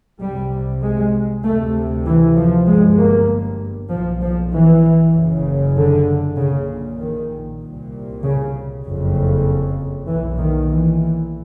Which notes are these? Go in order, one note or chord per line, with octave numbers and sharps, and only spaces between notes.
C2 C3 G3
G#3
D2 C3 A3
E3
F3
G1 G2 G#3
A#3
B1 A#2 F3
F3
E3
F#1 F#2 C#3
D3
A#1 A#2 C#3
D#3
C2 A#2
C#3
F#1 F2 C#3
B1 A#2 E3
D#3
E3